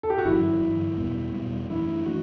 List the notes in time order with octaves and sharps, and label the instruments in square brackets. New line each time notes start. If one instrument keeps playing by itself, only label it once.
[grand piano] A4
G4
F#4
[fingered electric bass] G1 F#2 E3 [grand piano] E4
[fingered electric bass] G1 F#2 E3
E2 B2 G3 B3
E2 B2 G3 B3
[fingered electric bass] F#2 E3 A3 D4 [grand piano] E4
[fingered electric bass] E3 A3 [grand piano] F#4